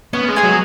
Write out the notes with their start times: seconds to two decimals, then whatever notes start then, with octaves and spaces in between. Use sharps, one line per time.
0.13 B3 C#4
0.28 G#3
0.36 G#4 C#5 G#5
0.43 F#3